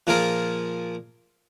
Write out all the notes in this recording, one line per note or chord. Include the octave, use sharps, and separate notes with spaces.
A#2 F3 A#3 F4 G#4 A#4